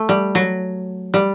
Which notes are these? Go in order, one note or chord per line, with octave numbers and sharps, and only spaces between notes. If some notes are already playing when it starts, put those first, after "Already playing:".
Already playing: A3
G3
F#3
G3